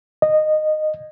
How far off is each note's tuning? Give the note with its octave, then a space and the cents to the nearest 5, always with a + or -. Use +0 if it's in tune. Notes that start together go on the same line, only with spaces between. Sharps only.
D#5 -15